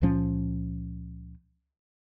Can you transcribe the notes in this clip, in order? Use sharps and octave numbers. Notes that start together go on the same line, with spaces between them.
C#2 A#2 F3 C#4